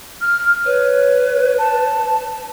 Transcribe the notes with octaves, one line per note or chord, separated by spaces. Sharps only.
F6
B4 C#5
A5